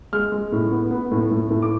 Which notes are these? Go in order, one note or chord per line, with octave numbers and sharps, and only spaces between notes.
G#3 F6
G#3
A2
B3
B3
A2
A2
A2
D6